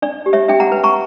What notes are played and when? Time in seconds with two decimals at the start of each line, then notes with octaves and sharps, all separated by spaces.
0.02 D4 D5
0.26 G4
0.33 C#5 E5
0.48 D4 E5 G5
0.60 F#5 A#5
0.72 B4
0.84 A#5 C#6